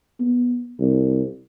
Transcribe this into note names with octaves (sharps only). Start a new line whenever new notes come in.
B3
C2